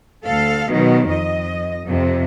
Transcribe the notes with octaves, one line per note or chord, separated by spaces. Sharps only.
D2 A4 F5
B2 D#3 F#3
F2 D#5
F2 C3